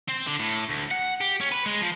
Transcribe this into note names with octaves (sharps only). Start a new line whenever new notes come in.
C4
D3
A2
D2
F#5
G4
C#4
B4
G#3
F3